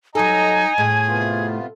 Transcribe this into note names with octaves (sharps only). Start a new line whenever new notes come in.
F#3 D#4 A4 D#5 G#5 A#5
A2 G#4
C3 B3 F4